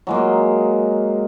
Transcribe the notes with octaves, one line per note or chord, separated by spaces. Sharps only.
F#3 G#3 A#3